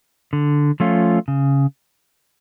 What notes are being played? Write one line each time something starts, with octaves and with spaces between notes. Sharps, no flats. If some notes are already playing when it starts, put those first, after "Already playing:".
D3
F3 A3 C#4 F4
C#3